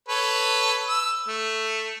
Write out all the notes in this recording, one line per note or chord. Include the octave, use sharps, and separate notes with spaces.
A4 B4 C#5
E6
A3